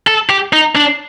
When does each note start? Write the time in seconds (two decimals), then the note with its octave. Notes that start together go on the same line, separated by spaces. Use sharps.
0.07 A4
0.30 G4
0.53 D#4
0.75 D4